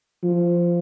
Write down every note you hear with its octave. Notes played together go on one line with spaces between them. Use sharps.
F3